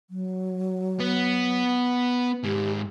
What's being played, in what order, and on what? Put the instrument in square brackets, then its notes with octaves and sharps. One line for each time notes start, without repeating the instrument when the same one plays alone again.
[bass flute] F#3
[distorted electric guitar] B3
[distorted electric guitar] G#2 D#3 [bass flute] G4